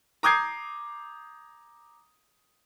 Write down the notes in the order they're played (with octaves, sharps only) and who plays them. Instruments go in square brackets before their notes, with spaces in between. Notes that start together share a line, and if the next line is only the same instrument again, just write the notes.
[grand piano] A#5 D6 D#6 G6 G#6 C7